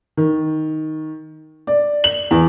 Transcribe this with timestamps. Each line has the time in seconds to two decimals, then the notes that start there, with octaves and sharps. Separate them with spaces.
0.17 D#3
1.67 D5
2.04 F#7
2.31 E2